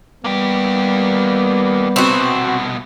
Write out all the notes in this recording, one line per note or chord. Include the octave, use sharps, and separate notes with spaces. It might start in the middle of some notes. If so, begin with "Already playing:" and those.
G3 A#3 B3 G4
C2 B2 C4 F#4